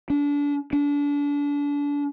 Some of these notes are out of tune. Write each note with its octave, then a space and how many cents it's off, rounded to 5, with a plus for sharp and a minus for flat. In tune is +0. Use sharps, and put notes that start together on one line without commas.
D4 -30
D4 -30